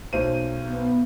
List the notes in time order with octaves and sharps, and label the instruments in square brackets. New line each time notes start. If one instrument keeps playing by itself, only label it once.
[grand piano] B1 C5 D#7
[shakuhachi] B3